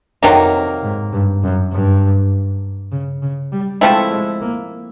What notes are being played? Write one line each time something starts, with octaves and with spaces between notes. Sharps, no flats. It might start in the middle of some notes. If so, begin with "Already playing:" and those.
F2 C3 D#3 F#3 A#3
G#2
G2
F#2
G2
C#3
C#3
G3
F3 G#3 A3 C4 E4
G#3
A#3